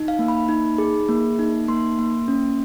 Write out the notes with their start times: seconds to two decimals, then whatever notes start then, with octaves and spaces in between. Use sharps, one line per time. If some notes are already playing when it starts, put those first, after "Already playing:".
Already playing: D#4
0.08 F5
0.19 A#3
0.28 B5
0.48 D#4
0.78 G#4
1.09 A#3
1.39 D#4
1.68 A#3 C6
1.99 A#3
2.28 C#4